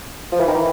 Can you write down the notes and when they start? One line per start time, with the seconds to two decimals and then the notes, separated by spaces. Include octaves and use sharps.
0.32 F3
0.40 E3
0.48 D#3
0.55 E3